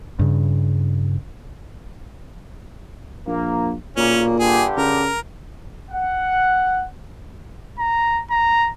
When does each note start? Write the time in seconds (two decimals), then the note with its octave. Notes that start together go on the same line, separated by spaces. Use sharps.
0.19 G2 C#3
3.27 A#1 A#3
3.97 B1 A#2 C#3 A#3 C#4
4.40 G2 D3 G4 G#4
4.77 C#3 A#4
5.91 F#5
7.79 A#5
8.31 A#5